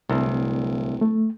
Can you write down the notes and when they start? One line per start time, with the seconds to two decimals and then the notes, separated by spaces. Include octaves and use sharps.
0.10 D1 C2
1.01 A3